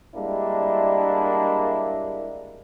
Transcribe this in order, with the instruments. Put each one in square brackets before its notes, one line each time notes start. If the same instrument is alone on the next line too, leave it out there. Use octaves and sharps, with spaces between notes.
[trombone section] G3 G#3 A#3 D4 E4